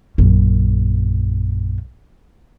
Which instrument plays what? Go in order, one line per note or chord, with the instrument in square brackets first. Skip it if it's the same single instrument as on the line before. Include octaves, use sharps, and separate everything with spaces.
[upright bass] A#1 F#2